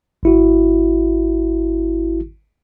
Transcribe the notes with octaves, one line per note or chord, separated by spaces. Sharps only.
G#1 E4 F#4